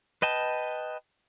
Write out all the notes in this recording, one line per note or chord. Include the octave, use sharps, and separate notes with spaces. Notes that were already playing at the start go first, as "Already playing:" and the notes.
B4 D#5 G5 A5